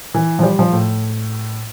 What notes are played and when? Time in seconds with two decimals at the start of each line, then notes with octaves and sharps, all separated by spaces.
0.14 E3
0.39 F3
0.43 G3
0.59 F3
0.73 A2